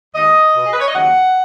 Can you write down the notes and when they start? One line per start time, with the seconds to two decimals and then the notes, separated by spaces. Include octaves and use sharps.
0.15 D#2 D#3 G#3 D#5
0.55 B2 B3
0.66 G#4
0.73 B4
0.80 C#5
0.88 D#5
0.95 D#2 C#3 F#3 F#5